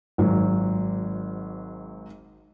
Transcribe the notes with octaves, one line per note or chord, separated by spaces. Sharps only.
G#1 G#2 F#3